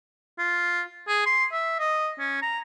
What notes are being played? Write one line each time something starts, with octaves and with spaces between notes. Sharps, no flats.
F4
G#4
C6
E5
D#5
C#4
A#5